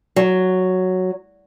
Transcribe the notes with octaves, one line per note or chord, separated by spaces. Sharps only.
F#3